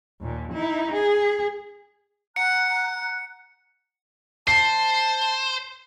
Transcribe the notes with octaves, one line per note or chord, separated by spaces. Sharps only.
D#2 A#2
D#4 E4
G#4
F#5 A#5 F#6 C#7
C5 A5 C7